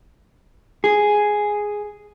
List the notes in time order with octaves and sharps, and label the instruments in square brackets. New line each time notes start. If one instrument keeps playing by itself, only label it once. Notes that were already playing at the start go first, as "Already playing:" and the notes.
[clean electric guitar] G#4